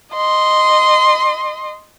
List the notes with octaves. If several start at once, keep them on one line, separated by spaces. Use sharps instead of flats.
D#5 C6